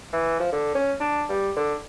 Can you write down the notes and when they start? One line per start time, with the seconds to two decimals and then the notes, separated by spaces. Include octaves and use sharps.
0.13 E3
0.40 F3
0.52 D3
0.75 C#4
1.00 D4
1.29 G3
1.57 D3